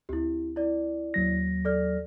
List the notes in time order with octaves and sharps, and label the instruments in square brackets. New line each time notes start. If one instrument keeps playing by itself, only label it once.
[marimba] D2 [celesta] E4 G4
[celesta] E4 D5
[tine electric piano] D#2 F#3 A#6
[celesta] A4 D5 F6